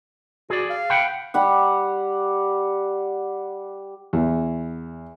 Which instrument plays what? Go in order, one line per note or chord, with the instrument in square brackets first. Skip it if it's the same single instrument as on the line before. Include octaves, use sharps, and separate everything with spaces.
[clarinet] F#4 [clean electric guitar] G#4 D5
[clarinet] F5
[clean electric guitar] F#5 G5 B5
[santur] G3 G4 F#5
[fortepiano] E2